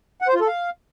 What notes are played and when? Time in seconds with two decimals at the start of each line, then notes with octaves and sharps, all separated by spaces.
0.22 F#5
0.28 C5
0.34 F4
0.41 A4
0.47 F5